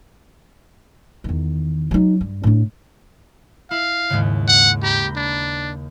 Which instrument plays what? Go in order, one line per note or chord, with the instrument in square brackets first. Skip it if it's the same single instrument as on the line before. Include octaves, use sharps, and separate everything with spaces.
[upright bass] E2 D#3
F#3 D#4
G2
A2 D4
[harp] E4 [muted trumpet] F5
[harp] D#2 G#2 C#3
[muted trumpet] F#5
[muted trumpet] G4 [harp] A#5 B5 G6
[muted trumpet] D4